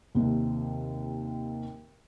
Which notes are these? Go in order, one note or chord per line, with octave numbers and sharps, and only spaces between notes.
D#2 C3